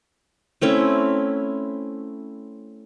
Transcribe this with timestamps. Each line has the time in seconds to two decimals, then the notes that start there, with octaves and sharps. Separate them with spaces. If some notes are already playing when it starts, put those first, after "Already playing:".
0.62 A3 C4 C#4 E4